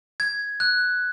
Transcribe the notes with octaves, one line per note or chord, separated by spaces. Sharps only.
G#6
F#6